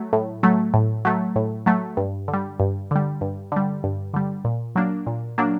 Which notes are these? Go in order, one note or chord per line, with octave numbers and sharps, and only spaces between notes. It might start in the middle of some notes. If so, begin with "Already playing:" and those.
Already playing: F#3 A3
A2
F#3 A3
A2
F#3 A3
A2
F#3 A3
G2
D3
G3
G2
D3 G3
G2
D3 G3
G2
D3 G3
A#2
F#3 A#3 D4
A#2
F#3 A#3 D4